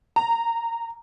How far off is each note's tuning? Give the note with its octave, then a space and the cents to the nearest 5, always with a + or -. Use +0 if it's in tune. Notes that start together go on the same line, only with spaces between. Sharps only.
A#5 -20